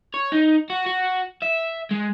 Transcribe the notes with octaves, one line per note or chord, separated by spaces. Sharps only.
C#5
D#4
F#4
F#4
E5
G#3